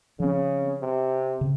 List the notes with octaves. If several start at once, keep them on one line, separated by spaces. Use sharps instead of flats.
C#3 F3 C4
C3
C#3